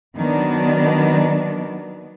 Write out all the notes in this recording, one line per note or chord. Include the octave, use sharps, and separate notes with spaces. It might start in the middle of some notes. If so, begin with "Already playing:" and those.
D#3 F#3 B3 D4